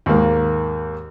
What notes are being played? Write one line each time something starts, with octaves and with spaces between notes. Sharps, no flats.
D#2 G#2 A#3